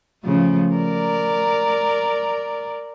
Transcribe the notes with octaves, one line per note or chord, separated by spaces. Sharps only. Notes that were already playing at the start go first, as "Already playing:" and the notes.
C#3 F3 A3
A#4 D5